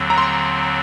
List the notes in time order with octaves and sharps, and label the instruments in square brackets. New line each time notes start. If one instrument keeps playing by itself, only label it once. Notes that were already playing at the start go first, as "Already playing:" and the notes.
Already playing: [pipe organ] D#2 D3 F#3 C4
[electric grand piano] A#5
C6